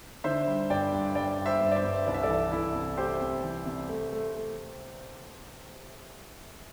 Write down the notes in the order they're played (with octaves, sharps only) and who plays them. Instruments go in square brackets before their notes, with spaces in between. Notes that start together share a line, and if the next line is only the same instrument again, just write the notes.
[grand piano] D3 C5 E5
G3
G2 D5 G5
G2
G3 D5 G5
G2
C5 E5
G2
D5
C5 E5
G2
C2 D5
E5
A4 D5
E3
C2 E4 A4
C3
A3 G4 C5
C3
E3
C3
A3
A3
A3